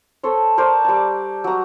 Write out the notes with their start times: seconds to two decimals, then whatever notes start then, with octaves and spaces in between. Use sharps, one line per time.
0.23 A4 C5 C#5
0.58 A#4 C5 D5 A5
0.85 G3 A5
1.44 F#3 A#5